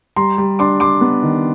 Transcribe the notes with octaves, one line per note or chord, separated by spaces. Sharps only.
G3 A#5 C6
G3
D4 C6 D6
G3 C6 D6
B3
D#3